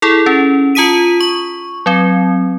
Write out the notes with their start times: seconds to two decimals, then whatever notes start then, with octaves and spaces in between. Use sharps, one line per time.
0.02 E4 G#4 A4
0.26 C#4
0.75 F4 A5 D#6 B6 D#7
1.20 C#6
1.86 F#3 C4